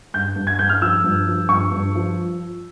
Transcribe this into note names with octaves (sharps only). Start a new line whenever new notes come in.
G2 G6
G2
G#6
G2 G6
F6
F3 E6
G2
F3
G2 C#6
G2
F3